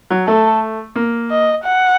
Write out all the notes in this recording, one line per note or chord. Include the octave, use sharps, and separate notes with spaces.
F#3
A3 A4
A#3
D#5
F#5